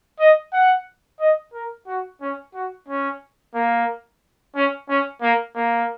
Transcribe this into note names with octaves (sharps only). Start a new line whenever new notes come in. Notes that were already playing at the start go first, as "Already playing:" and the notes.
D#5
F#5
D#5
A#4
F#4
C#4
F#4
C#4
A#3
C#4
C#4
A#3
A#3